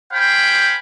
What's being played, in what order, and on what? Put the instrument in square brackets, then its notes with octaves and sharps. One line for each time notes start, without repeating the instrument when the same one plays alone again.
[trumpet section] C5 F5 G5 G#5 B5